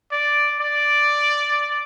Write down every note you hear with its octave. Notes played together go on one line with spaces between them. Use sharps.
D5
D5